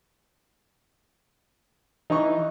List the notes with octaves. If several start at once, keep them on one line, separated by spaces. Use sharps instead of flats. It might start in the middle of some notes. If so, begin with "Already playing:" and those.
E3 D#4 C#6